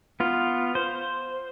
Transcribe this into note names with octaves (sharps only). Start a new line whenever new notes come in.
B3 F4
C5